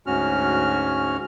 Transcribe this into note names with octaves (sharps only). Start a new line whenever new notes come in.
D2 G#2 C#4 F#4 F6